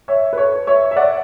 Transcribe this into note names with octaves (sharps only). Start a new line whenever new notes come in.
C#5 E5
B4
A4 C#5
C#5 E5
E5
D5 F#5